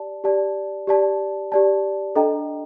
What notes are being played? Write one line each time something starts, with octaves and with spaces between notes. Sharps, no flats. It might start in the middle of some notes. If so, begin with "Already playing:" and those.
Already playing: G4 D5 A5
G4 D5 A5
G4 D5 A5
G4 D5 A5
D4 A4 D#5 G5 A#5